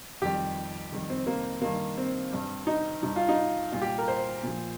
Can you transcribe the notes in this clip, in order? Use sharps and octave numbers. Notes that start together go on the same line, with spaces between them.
F2 D#3 G3 G4
F2 D#3 G3
C4
A#3
G2 D#3 G3 A#3
C4
G2 G3
D#4
G2 G3 D#4
F4
D#4
A#2 G3 F4
G4
A#4
C5
A#2 F3